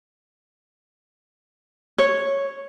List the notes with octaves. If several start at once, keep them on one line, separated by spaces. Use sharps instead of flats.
C#5